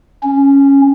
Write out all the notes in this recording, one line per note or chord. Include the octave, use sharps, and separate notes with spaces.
C#4